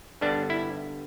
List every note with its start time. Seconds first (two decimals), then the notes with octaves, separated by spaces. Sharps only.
0.21 G2 D3 G3 B3 D4
0.50 E4